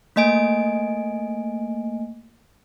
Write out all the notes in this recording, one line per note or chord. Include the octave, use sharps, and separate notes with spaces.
A3 A#3 D#5 G#5 D7